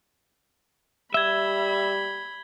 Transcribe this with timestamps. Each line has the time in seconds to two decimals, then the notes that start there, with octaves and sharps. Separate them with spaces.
1.14 G3 E5 B5 G#6 G7